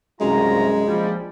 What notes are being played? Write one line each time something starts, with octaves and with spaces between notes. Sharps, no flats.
C2 F#2 G#3 F4 A#5
A#1 F3 G3